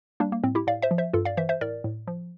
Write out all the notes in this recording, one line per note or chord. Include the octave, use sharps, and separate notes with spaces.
G3 A#3 D4
A#3
A2 C4
E4 G4
A2 D5 F5
C5 E5
F3
C5 E5
G2 F4 A4
D5 F5
E3 C5 E5
C5 E5
A2 A#4 D5
A2
F3